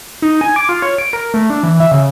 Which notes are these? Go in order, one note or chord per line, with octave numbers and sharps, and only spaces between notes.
D#4
G#5
D6
F4
C#5
D7
A#4
A3
D4
E3
E5
C#3